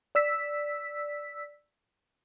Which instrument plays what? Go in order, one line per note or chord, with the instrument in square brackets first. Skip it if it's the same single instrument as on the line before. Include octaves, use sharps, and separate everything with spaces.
[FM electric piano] D5 E6 B6